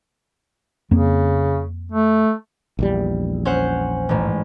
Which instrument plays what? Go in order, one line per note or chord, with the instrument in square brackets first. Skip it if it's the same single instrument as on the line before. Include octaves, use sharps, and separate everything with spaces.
[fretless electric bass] F2 A#3 C4 [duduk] C#3
[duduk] A3
[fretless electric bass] A#1 E2 G3
[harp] C#4 C5 F#5
A1 G#2